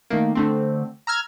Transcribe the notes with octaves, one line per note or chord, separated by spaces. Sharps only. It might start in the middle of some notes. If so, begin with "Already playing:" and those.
D#3 A3 A#3
D3 A3 C4
A#5 E6 F6 G#6